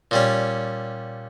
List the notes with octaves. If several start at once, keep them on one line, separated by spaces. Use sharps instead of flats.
A#2 G3 C#4